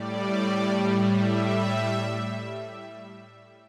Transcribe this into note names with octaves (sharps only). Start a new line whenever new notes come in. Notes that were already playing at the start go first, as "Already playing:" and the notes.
Already playing: A2 G3 D5
E5